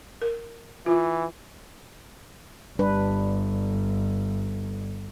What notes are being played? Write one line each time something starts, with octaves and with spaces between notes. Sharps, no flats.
A#4
E3 F4
G1 G3 D4 B4